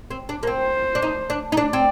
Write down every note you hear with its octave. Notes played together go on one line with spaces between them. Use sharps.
C4
D4
A#3
C4 C5
D4
D#4
D4
D#4
D4 D5
C4